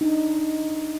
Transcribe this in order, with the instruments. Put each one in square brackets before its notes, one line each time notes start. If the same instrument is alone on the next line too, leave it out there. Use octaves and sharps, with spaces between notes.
[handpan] D4 D#4